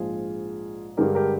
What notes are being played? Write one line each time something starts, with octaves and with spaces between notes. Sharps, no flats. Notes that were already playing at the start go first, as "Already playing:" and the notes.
Already playing: A#1 G#2 F3 F4 G#4
G2 D3 G#3 G4 A#4
G4 A#4